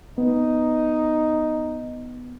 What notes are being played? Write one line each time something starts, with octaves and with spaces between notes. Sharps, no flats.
B3 D#4